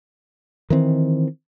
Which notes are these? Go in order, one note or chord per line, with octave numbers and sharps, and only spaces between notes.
D#3 E3 C4